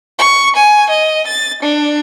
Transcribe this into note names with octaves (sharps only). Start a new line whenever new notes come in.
C#6
G#5
D#5
A6
D4